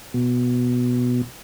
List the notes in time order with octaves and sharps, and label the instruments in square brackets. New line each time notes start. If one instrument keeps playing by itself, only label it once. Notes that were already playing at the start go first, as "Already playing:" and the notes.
[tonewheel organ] B2